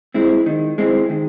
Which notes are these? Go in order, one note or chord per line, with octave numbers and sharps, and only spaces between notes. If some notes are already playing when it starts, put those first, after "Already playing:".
G#3 C4 E4
D#3
G#3 C4 E4
D#3